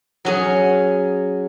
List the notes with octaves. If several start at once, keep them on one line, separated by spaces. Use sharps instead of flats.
F#3 C#4 G#4